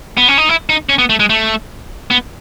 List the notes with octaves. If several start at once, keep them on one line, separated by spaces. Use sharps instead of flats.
B3
C#4
D#4
E4
D#4
C#4
B3
A3
G#3
A3
B3